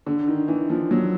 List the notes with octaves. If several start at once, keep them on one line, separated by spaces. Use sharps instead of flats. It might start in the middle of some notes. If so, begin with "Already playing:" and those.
D3
D#3
E3
F3
F#3